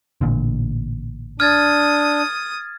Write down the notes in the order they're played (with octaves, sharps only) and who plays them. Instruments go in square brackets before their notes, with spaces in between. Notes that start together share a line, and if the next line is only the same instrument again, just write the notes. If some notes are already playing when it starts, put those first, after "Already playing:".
[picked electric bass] A1 A#2 D3
[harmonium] D4 [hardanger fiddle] D#6 [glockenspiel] F6 G#6 A6